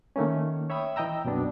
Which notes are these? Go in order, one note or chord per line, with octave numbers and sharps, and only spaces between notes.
D#3 A3 A#3 C#4
C#5 E5 G5 B5 D#6 E6
E3 D#5 G5 A#5 E6
C2 F#2 B2 B3 D4